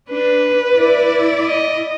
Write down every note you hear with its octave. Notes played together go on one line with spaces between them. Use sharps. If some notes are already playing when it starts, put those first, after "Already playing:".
D4 B4
E4 D5
D#5